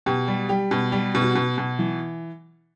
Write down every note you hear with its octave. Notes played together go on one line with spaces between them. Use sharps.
B2 G4
G3
G3 G4
B2
G3 G4
B2
F#4
B2
B2
E3